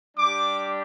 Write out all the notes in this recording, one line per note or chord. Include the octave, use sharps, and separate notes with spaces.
G3 D4 G4 D6